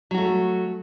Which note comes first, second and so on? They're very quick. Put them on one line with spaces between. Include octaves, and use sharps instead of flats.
F#3 F#4 A3